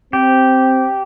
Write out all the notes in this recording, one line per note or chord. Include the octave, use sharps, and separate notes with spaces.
C4 G4